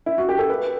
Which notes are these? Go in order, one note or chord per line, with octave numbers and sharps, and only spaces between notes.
E4
F#4
G4
A4
B4